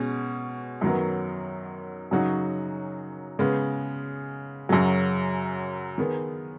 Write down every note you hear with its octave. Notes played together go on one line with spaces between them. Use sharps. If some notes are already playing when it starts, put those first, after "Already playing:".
Already playing: B2 G#3 C#4
F#2 D#3 F#3 B3
F#2 C#3 F#3 D#4 F#4
C#3 G#3 B3
F#2 C#3 F#3
D#3 B3 G#4